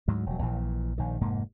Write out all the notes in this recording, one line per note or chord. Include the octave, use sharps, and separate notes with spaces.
D2 G#2 F#3
E1 F#3
A#1 A#2 E3
A#1 D#3
F1 G#2 A#3